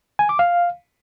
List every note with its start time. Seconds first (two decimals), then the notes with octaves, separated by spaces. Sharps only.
0.19 G#5
0.29 D6
0.39 F5